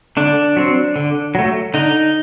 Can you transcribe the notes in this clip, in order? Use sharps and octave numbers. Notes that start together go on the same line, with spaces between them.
D3 D4
F#3 C4
D3
F#3 A3
D3 D#4